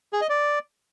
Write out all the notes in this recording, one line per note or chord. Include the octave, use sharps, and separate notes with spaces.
G#4
D#5
D5